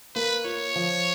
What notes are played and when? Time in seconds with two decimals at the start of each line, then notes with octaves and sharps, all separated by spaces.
0.15 A#3 B4
0.44 F4 C#5
0.76 F3